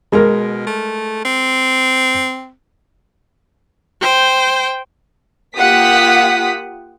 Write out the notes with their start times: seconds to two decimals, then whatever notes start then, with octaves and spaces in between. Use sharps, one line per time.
0.12 B2 G#3 A#4
0.67 A3
1.25 C4
4.01 C5 G5
5.57 A#3 F4 G4 F#5 D#6 B6